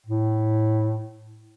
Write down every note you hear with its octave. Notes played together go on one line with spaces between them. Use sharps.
A2